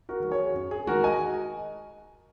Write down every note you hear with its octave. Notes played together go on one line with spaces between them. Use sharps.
F#4 A#4
D#3 F#3 A#4
G#4 C#5
F#2
G#4
D#3 G#3 F#4 A#4
D#5 G#5